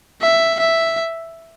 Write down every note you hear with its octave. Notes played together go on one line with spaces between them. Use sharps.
E5
E5